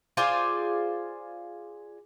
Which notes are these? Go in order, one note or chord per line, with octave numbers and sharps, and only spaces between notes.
F4 G#4 C5 D5